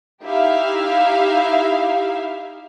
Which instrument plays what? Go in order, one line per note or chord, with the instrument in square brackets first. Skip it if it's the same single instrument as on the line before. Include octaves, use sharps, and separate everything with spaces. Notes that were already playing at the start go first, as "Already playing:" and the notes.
[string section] D#4 E4 G4 E5 F5